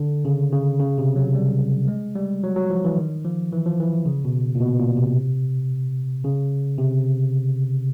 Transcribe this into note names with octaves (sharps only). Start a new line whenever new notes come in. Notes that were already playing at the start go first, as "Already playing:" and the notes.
Already playing: D3
C#3
C#3
C#3
C3
F#3
G3
G#3
G3
F#3
F#3
F3
E3
D#3
F3
E3
F3
E3
C#3
B2
A#2
B2
A#2
C3
C#3
C3